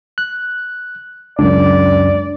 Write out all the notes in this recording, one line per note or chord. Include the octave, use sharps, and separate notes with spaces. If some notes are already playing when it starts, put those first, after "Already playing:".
F#6
C#2 F#2 D4 D5